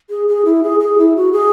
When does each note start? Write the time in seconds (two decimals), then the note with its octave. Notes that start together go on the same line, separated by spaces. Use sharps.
0.10 G#4
0.28 G#4
0.45 E4
0.63 G#4
0.80 G#4
0.98 E4
1.16 F#4
1.33 G#4